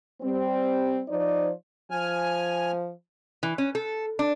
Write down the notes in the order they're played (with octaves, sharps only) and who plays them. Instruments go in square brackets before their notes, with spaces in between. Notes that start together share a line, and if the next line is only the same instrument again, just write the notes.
[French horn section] G3 C4
F3 D#4 C5 D5
[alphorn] F3 [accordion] G#5 F6
[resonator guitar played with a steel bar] E3
C#4
A4
D4